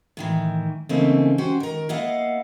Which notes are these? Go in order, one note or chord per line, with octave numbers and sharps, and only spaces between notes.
A2 D#3 E3
C#3 E3 A3 A#3 C4 D#4
C#4 F#4 G4 C5
D#3 A#4
A#3 B3 E4 D#5 F5 F#5